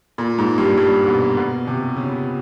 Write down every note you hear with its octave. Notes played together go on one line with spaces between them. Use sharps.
A#2
G#2
G2
G2
B2
B2
C3
C#3